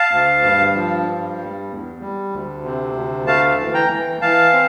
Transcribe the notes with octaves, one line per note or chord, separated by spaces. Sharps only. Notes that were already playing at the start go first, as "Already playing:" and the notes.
Already playing: F5 A5
D2
G2
F3
G2
G3
E2
G3
D2
C3
D2
A3 F5 A5
E3
G5 A#5
E3
E3 F5 A5
C4